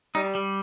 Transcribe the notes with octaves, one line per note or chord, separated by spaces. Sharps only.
G3 D#4
G3